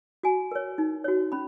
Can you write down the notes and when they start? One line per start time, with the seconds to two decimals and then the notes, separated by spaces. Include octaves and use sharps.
0.23 F#4 G#5
0.52 A#4 C#5
0.78 D#4
1.04 F#4 C#5
1.32 C#4 B5